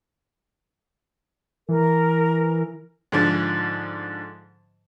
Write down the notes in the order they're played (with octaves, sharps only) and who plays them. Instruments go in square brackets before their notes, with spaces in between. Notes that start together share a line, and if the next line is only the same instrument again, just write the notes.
[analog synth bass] E3 [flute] A#4
[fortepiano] G#2 D3 F3